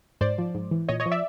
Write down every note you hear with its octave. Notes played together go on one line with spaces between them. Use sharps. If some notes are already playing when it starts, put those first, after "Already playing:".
G#2 C5 D5
F3
G#2
E3
A#2 C#5 D#5
C#5 D#5
F3
D5 E5